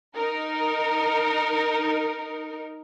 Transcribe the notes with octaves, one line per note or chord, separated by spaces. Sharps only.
D#4 A#4